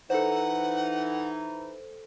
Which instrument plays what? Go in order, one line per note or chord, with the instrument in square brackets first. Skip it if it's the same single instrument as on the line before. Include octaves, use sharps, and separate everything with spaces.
[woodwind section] E3 D#4 [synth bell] A4 C5 [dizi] F#5